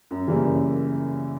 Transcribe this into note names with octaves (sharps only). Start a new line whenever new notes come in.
F#2
C#3 E3 G3 A#3
F#2